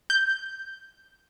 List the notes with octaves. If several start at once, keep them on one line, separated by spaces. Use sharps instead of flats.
G6